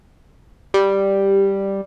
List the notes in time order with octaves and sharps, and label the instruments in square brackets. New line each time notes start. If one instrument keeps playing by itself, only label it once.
[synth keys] G3